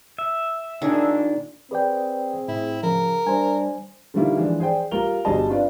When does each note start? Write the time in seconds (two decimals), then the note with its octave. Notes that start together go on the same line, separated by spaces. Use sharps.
0.18 E5
0.82 A#2 D#3 D4 G#4
1.71 C4 G#4 B4 D5 G5
2.48 A2 E4
2.83 C#3 F3 A#4
3.27 G3 D4 C5 G#5
4.14 D3 D#3 G3 A#3 E4 F4
4.37 E3 F3 G#3 D4
4.60 G#4 C5 D5 G5
4.91 G3 A#3 F4 A#4 F7 G7
5.25 G1 G3 F#4 G#4 D#5 A5
5.48 C4 D4 F4 B4 D5